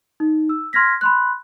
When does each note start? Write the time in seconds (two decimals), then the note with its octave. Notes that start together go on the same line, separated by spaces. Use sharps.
0.20 D#4
0.49 E6
0.73 C6 F6 G#6 A#6 B6
1.01 B5 C6 F#6